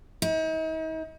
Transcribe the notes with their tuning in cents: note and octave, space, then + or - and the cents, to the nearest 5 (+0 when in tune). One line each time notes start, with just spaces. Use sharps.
D#4 +40